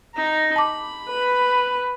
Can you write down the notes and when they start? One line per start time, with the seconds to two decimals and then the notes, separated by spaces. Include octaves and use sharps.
0.14 D#4 A#5
0.56 A5 B5 D6
1.11 B4